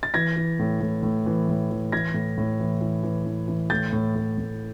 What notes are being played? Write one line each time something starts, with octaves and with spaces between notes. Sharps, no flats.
A6
E3 G#6 A#6
E3
A2
A2
A2
E3
A2
E3
E3 G#6 A#6
A2
A2
E3
E3
E3
E3
E3
A2 G6 A6
A2
A2
A2